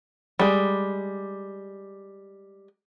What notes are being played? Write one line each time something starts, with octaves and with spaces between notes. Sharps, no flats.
G3 G#3